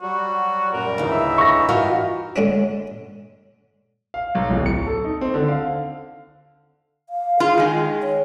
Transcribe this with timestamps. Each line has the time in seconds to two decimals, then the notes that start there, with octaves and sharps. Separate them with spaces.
0.01 F#3 G3 F#4
0.73 F#2 A#2 G3 A#4
0.98 D2 C#3 E3 D#4
1.11 E5
1.38 C#6 A#6
1.69 F4 F#4 A#4
2.36 D3 G#3 C#4 D4
4.14 F5
4.35 B1
4.50 D1
4.66 C#7
4.86 A4
5.04 D#4
5.21 C4
5.34 D3
5.48 F5
7.09 F5
7.40 F4 G#4
7.57 D#3 G#3
8.03 C#5